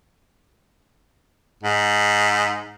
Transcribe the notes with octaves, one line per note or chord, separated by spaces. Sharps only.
G#2